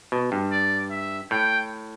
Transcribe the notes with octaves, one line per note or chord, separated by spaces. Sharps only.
B2
G2
D5
E5
A2 G5